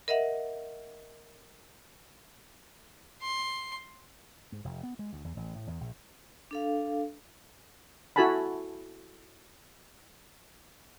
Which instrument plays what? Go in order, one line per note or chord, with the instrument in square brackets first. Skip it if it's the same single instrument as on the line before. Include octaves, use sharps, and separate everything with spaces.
[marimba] A#4 D#5 E5 F#5
[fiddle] C6
[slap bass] G#2
F1
B3
G#3
D2
E2
A1
A2
E2
A#1
[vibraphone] D4 A4 F5
[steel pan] E4 F#4 A4 G#5 A5 B5